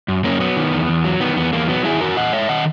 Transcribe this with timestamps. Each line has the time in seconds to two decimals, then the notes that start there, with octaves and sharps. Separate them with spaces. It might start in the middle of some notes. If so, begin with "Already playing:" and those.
0.08 F#2
0.24 F#2 A#3 C#4
0.40 F#3 B3
0.57 D#3
0.72 E2
0.89 E2
1.04 F#3
1.20 D#3 B3
1.37 E2 B3
1.53 E2 A#3
1.68 F#3 B3
1.85 D#3 E4 G#4
2.00 E2 F#4 A#4
2.17 E2 D#5 F#5
2.33 G#3 C#5 E5
2.49 D#3 D#5 F#5